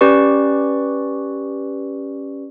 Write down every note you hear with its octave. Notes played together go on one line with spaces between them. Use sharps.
C#4 G4 B4 D5 C#6